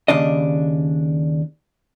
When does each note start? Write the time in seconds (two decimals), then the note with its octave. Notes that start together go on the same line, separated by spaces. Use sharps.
0.08 D#2 C#3 D4 D#5